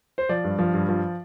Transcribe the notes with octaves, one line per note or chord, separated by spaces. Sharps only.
C5
F3 D5
G2
F3
G2
F3